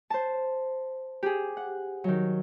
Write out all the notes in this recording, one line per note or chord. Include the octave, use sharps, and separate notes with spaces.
C5 A5
G4 G#4
F#5
D#3 F#3